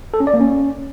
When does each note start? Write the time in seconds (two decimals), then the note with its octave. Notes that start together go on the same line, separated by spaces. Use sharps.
0.14 A4
0.20 C#4
0.27 D5
0.34 A#3
0.40 C#4